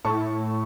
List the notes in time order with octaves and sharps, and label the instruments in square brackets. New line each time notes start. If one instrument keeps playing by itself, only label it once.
[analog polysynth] A2 [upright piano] A5 C#6